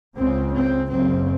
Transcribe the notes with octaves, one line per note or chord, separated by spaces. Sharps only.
C#2 C#3 C4
C4
F#1 F#2 C#3 C4